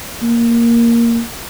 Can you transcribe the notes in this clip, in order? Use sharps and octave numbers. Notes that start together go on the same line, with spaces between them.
A#3